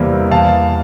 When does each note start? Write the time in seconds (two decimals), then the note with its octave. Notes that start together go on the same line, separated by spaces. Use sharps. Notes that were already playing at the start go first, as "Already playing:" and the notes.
Already playing: E2 C3 G3 A#3
0.31 E2 F5 A5